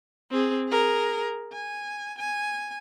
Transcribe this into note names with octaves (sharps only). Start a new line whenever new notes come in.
C4 G#4
G#4 A#4
G#5
G#5